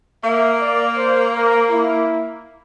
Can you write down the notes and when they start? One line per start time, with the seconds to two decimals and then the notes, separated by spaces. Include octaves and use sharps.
0.24 A#3 E5
0.61 D5
0.97 C5
1.35 A#4
1.70 E4